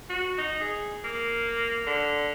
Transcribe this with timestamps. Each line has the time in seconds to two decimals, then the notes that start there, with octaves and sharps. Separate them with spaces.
0.10 F#4
0.38 D#4
0.61 G#4
1.04 A#3
1.87 D3